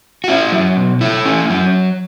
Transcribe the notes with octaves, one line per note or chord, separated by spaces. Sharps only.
F#4
C#4 E4
F#3
B2
A3 E4
C#4
F#3